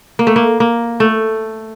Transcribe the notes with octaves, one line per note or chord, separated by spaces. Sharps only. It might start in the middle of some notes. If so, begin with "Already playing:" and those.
A#3
A3
A#3
A#3
A3